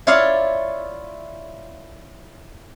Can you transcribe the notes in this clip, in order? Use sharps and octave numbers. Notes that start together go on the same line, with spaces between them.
E4 F4 C#5 D5 F5